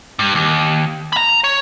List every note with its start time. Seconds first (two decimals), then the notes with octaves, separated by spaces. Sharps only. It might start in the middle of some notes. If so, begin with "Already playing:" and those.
0.19 G2
0.35 D#2
1.13 A#5 B5
1.44 C#5